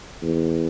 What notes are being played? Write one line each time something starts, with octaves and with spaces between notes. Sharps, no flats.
E2